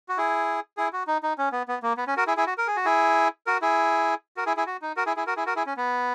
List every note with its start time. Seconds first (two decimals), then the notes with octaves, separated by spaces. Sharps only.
0.09 F#4
0.18 E4 G#4
0.77 E4 G#4
0.93 F#4
1.07 D#4
1.23 D#4
1.38 C#4
1.52 B3
1.68 B3
1.83 A#3
1.97 B3
2.07 C#4
2.17 F#4 A#4
2.27 E4 G#4
2.37 E4 G#4
2.47 F#4
2.58 A#4
2.67 G#4
2.77 F#4
2.86 E4 G#4
3.47 F#4 A#4
3.62 E4 G#4
4.37 F#4 A#4
4.46 E4 G#4
4.57 E4 G#4
4.66 F#4
4.82 D#4
4.97 F#4 A#4
5.06 E4 G#4
5.16 E4 G#4
5.27 F#4 A#4
5.37 E4 G#4
5.46 F#4 A#4
5.56 E4 G#4
5.66 C#4
5.77 B3